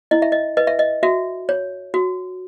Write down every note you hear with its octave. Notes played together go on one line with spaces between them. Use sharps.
E4 D#5
E5
D#5
B4 D#5
E5
D#5
F#4 E5
C#5
F#4